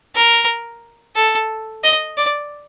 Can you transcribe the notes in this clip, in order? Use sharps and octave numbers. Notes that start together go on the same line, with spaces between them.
A#4
A4
D#5
D5